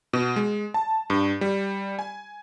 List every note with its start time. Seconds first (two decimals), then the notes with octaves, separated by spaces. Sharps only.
0.13 B2
0.36 G#3
0.74 A5
1.10 G2
1.41 G3
1.99 G#5